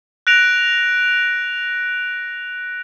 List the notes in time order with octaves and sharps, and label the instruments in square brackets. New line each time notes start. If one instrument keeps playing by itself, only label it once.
[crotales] F#6 A#6 D7 F7